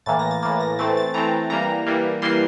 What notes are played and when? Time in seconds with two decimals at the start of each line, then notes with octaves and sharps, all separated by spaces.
0.06 A2 E3 A#3 A6
0.19 A#6
0.31 A6
0.43 A2 E3 A#3 A6
0.60 A#6
0.79 E3 A3 C4 A6
0.97 A6
1.14 E3 A3 C4 A#5
1.50 E3 G3 A#3 A#5
1.87 E3 G3 A#3
2.22 E3 G3 A#3 C6